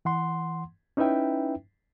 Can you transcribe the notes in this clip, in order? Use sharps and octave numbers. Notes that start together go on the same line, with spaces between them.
E3 F#5 C6
C#4 D#4 E4 B4 E5 G5